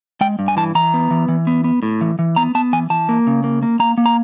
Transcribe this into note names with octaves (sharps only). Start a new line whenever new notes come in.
G#3 G5
G2
G#5
E3 A5
E3 A#5
B3
E3
E3
B3
B3
A2
E3
E3
B3 A#5
B3 A5
E3 G#5
E3 A5
A#3
C#3
A#3
A#3
A#3 A#5
A#3
A#5